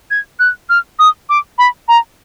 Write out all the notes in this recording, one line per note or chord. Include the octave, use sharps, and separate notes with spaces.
G#6
F#6
F6
D#6
D6
B5
A#5